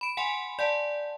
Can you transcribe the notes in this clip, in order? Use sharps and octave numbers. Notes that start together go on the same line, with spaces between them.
B5 D7
F#5 G#5 C6
D5 F#5 A5